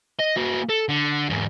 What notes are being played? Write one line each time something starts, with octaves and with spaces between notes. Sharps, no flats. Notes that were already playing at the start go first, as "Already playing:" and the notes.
D#5
A#3 F#4
A4
D3
E2 G#2